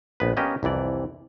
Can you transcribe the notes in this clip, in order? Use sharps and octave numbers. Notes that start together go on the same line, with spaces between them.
A#1 B3 B4
A#3 B3 C#4 G4 D#5
C2 F2 E3 D5